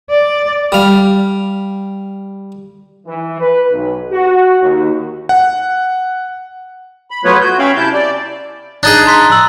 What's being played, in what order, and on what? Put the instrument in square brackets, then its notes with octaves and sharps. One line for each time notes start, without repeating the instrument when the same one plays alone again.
[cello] D5
[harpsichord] G3 F5
[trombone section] E3
B4
B1
F#4
D#2
[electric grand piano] F#5
[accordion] B5
F#3 A3 B3 F4 B4 C#5
F#4 G6
C#4 C#5 E5 F5 G5 B5
C3 E4 A5 G6
D5
[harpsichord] D4 D#4 G#4 [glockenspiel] F#6 A6
[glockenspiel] A#5 C6 B6
E6 F#7